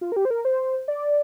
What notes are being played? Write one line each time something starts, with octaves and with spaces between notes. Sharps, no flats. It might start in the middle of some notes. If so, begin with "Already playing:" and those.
F4
A#4
G4
C5
A#4
C5
D5